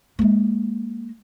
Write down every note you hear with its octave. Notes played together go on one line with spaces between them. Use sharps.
G#3 A#3